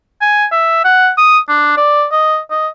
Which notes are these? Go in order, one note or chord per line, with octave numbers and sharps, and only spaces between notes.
G#5
E5
F#5
D#6
D4
D5
D#5
D#5